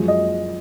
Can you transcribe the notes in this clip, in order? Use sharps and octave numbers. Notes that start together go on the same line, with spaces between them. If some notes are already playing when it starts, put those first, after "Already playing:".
Already playing: F#2 F3 G#3
D#5